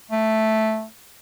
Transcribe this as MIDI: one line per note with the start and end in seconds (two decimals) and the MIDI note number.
0.11 0.85 57